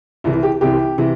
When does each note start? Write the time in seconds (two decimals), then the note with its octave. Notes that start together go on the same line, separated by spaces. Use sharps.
0.24 C2 C3 E3 E4
0.43 G4
0.61 C2 C3 E3 G4
0.98 C3 E3